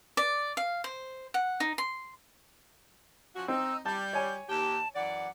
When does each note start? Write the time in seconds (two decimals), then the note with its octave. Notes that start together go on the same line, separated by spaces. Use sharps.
0.17 D5
0.57 F5
0.84 C5
1.34 F#5
1.60 D#4
1.78 C6
3.36 F3 C#4 F#4
3.48 C4 D#4 E6
3.86 G3 A5 G6
4.13 C#5 G#5
4.49 D#2 G4 A5
4.95 F#2 E3 D5 F#5